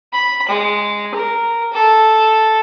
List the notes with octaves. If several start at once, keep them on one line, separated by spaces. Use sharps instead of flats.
B5
G#3
A#4
A4